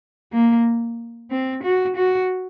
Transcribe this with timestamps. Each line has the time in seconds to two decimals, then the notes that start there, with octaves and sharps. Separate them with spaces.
0.33 A#3
1.31 C4
1.63 F#4
1.96 F#4